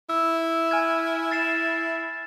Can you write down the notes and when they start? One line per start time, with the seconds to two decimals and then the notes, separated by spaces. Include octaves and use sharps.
0.10 E4 E6
0.71 G#5 F6 G#6
1.31 A6 C7 E7